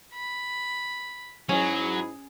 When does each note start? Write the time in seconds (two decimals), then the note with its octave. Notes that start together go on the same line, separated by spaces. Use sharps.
0.13 B5
1.49 G#2 F#3 C#4 E4 G#4